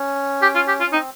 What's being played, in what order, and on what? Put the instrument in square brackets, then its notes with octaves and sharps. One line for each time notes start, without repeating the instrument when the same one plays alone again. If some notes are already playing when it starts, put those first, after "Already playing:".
Already playing: [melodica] C#4
[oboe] G4
F4
G4
F4
[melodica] C#4
[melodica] C4 [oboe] D#4